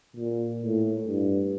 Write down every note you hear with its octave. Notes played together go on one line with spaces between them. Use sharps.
A#2
A2
G2